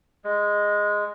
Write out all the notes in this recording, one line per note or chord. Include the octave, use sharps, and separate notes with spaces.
G#3